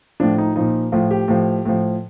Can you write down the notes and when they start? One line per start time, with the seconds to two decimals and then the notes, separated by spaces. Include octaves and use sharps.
0.20 A2 F3 D4
0.38 D#4
0.56 A#2 F3 D#4
0.92 A2 F3 F4
1.11 G4
1.28 A2 F3
1.65 A2 F3